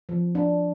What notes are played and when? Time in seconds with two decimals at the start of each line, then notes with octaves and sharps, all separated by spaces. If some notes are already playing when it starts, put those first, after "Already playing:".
0.09 F3
0.35 D4